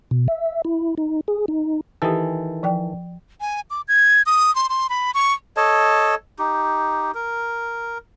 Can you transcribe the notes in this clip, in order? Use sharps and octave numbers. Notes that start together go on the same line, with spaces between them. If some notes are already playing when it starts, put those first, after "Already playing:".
B2
E5
E4
D#4
G#4
D#4
D#3 E3 G4 A4 G#5
F3 D5 G5
G#5
D6
G#6
D#6
C6
C6
B5
C#6
A4 C#5 D#5 A5
D#4 G4
A#4